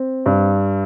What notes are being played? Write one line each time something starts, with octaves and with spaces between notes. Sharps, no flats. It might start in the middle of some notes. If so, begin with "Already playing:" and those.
Already playing: C4
G2